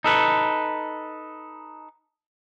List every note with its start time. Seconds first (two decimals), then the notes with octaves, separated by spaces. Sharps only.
0.04 D#4 A4 B4